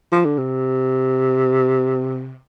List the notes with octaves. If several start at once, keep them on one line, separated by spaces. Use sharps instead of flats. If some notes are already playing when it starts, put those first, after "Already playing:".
F3
D3
C3